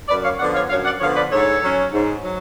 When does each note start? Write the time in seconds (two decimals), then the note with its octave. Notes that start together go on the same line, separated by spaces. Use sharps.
0.08 F#2 B4 D5
0.24 C#5 F5
0.39 D3 F3 B3 D5 F#5
0.55 C#5 F5
0.70 F#2 C#5 F5
0.85 D5 F#5
1.00 D3 F3 B3 C#5 F5
1.16 B4 D5
1.31 G#2 A4 C#5
1.62 F#3 C#4
1.92 G#2
2.23 F#3